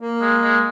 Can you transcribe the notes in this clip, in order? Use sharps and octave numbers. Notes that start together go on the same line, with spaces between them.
A#3
G#3
G#3